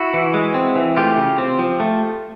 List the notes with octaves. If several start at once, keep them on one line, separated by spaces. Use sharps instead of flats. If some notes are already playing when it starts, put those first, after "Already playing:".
Already playing: E4 F#4
E3
G#3
C4
E3
A3 F4 G4
C#3
C4
F3
A3